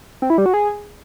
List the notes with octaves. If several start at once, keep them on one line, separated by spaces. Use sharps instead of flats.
C4
E4
G3
F#4
G#4